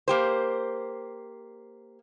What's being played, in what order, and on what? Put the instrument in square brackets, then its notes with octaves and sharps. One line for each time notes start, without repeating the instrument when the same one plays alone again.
[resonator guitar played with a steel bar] A#3 G4 C5